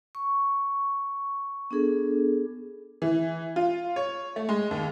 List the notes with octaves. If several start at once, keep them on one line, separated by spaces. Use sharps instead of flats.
C#6
B3 D4 G#4 A4
E3
F4
C#5
A3
G#3
D#2